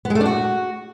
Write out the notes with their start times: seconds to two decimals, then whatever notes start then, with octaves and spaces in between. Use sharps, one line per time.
0.05 B3
0.10 G#3
0.15 A3
0.20 D4
0.26 F#4